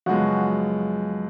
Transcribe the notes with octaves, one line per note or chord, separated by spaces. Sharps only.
F#2 C#3 F3 G#3 B3 F#4